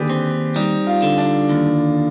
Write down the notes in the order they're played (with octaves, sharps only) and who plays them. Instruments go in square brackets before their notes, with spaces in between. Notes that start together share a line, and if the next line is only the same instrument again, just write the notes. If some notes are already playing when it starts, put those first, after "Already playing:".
Already playing: [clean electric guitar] D#2 D3 [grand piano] G4 G#4 B4 D5
[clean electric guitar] C4
[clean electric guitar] G3 [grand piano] D#4
[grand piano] F4
[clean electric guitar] D3
[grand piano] D4
[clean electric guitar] D#2